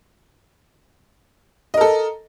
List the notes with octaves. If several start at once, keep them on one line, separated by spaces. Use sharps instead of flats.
A4 A#4 D#5